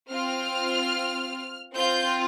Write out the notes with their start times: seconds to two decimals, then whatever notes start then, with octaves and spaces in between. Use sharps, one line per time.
0.11 C4 F4 F6
1.74 C4 F4 G6